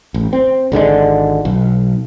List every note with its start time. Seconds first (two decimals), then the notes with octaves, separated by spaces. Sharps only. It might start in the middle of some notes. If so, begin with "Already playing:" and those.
0.14 A1
0.33 C4
0.72 G#1 D3 D#3 G#3
1.45 B1